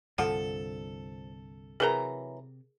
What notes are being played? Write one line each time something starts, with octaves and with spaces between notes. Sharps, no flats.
C2 G2 D3 F3 A4 F#5
C3 E3 F#3 G#4 A#4 A#5